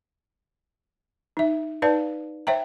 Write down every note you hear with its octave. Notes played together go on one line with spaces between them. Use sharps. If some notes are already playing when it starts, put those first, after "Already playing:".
D#4 E5
D#4 B4 D5 F5 A5
C5 C#5 E5 G5 A#5